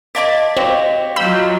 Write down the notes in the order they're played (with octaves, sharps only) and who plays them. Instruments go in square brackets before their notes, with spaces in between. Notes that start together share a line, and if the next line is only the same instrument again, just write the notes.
[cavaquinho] D5 A5 D6 [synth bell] D#5 F5 B6
[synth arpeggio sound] C4 [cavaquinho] F#4 G4
[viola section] F#3 F4 [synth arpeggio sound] B5 E6 G6